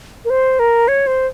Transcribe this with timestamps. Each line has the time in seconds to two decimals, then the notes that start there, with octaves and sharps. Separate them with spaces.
0.25 A#4
0.30 C5
0.59 A#4
0.88 C#5
1.07 C5